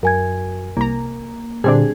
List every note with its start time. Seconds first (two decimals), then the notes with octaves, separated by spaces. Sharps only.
0.03 F#2 A#4 G#5 G#6
0.77 C2 A#3 A#5
1.64 A#2 D3 G3 C4 D4 G#4